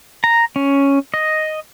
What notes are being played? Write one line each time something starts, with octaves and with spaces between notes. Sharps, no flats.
A#5
C#4
D#5